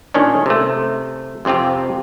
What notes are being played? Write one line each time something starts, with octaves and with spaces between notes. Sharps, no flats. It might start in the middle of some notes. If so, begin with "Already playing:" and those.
A#2 D#3 C#4 D4
C3 A3
F2 C3 C4 F4 G4